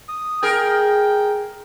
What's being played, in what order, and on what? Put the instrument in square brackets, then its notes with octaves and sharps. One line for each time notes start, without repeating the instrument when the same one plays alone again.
[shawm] D#6
[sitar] G#4 A#4 [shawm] G5